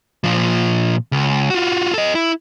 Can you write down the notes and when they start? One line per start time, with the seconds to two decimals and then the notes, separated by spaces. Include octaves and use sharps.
0.24 A#2 F3
1.12 C#2
1.50 F4 F#4
1.94 A4 D#5
2.15 E4